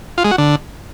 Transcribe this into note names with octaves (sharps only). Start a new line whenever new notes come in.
F4
G#3
F#4
D3